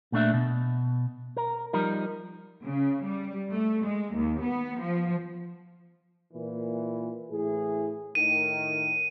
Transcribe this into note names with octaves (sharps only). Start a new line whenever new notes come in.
A#2 A3 D4 E5
B2
A#4
F3 G3 D#4 A#4
C#3
G3
A3
G#3
D#2
B3
F3
A#2 E3
A2 E3 G#4
A2 D#3 D#7